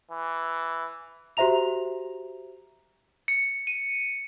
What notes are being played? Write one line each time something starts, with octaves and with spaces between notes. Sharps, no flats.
E3
F#4 G4 C5 E5 A#5 F7
C#7
D#7